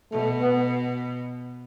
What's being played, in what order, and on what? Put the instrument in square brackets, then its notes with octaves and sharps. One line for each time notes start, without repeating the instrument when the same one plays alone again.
[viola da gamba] B2 [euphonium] A3
[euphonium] B3